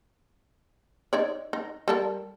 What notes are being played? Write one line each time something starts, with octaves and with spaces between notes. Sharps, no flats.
D#4 C#5 D5
D#4
G3 A4 A#4